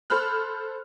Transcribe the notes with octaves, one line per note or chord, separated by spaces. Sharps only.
A4 C5 B5 F6 F#6